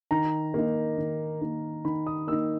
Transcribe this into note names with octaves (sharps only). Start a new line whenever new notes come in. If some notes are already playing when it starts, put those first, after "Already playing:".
D#3 A#5
A#3 D#4
D#3
A#3 D#4
D#3 B5
D#6
A#3 D#4 E6